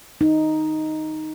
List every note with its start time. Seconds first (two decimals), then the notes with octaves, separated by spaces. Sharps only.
0.21 D#4